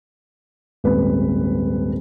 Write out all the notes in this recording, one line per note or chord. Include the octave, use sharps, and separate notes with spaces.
D#1 G#1 B4